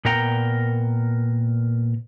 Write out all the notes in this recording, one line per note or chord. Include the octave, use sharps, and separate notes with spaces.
A#2 B3 A#4 G5 A#5